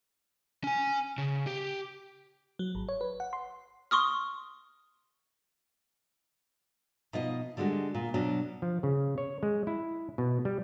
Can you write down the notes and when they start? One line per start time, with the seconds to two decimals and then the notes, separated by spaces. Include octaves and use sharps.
0.64 C#4 G#5
1.18 C#3
1.47 G4
2.59 F#3
2.75 G#1
2.89 C#5
3.01 B4
3.20 F#5
3.33 C6
3.91 C6 C#6 D#6 F6
7.13 B2 F3 D#4 D#5
7.57 D3 G3 G#3 F#4 G4
7.95 A#2
8.14 B2 F#3 D4
8.62 F3
8.83 C#3
9.18 C#5
9.43 G#3
9.67 E4
10.18 B2
10.45 G3